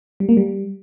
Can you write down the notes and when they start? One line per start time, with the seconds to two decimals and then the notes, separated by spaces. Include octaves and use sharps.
0.20 G3
0.29 A#3
0.37 G3